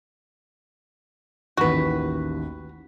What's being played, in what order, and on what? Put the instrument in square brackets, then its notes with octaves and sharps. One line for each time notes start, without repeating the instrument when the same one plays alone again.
[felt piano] A1 D#2 [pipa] F#4 B4